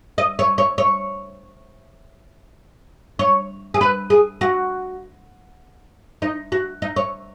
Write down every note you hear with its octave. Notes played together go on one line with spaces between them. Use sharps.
D#5
C#5
C#5
C#5
C#5
G#4
B4
G#4
F#4
D#4
F#4
D#4
C#5